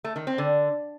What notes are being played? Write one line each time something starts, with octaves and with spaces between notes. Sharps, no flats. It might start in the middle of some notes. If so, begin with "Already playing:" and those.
A3
D#3
C4
D3